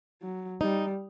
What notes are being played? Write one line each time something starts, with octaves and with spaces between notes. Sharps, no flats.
F#3
G3 D#4